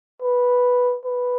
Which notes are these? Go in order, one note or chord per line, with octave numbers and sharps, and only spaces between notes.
B4
B4